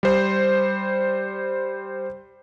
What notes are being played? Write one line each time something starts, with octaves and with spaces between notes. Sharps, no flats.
G3 C5